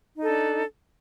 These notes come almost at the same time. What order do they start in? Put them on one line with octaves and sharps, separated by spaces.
D#4 A4 D4